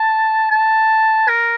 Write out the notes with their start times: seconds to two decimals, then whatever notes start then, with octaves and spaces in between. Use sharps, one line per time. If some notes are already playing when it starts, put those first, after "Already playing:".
Already playing: A5
0.51 A5
1.28 A#4